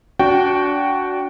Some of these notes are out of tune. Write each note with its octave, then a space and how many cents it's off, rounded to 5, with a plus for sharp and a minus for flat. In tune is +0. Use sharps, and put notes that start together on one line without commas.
D4 -30 F#4 +0 G5 -10